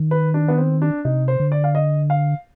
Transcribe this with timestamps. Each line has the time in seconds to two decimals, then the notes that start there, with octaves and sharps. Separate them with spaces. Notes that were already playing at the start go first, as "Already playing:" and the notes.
Already playing: D#3
0.11 B4
0.34 D4
0.48 B3
0.58 C4
0.82 D4
1.05 C3 D#4
1.28 C5
1.40 D3
1.52 D5
1.64 F5
1.75 D#5
2.10 F5